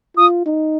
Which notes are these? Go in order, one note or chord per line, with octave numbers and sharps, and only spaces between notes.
F4 D#6
D#4